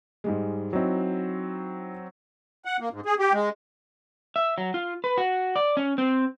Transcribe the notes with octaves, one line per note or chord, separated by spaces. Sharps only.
G#2 G3 G#3
F#3 C4 D#4 E4
F#5
A#3
G#2
G#4
G4
G#3
E5
F#3
F4
B4
F#4
D5
C#4
C4